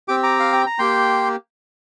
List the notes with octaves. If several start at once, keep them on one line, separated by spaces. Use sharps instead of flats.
C4 G4 D6
A#5 D6
F5
G5
A#5
A#3 G4 G5 C6